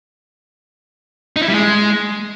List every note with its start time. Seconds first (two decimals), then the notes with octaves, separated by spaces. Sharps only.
1.36 D#4
1.42 E4
1.48 G3
1.54 G#3